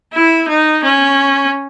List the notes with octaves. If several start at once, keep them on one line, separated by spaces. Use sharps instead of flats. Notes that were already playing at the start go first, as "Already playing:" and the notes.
E4
D#4
C#4